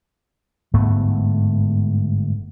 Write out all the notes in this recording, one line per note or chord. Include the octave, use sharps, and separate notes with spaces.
G1 G#2 A3 B3